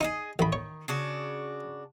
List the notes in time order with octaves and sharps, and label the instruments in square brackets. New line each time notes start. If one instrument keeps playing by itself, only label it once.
[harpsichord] D#4 [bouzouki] G#4 A#4 D#5
[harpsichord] A1 B5 [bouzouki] D#3
[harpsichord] C#5
[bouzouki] C#3 D4 F#4